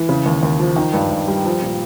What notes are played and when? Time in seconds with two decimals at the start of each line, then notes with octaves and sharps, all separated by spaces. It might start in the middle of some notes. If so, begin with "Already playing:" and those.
Already playing: E3
0.09 C#3
0.26 D#2
0.43 D#2
0.60 F3
0.76 D#3
0.93 G2
1.10 G2
1.28 G3
1.46 F3
1.62 A#2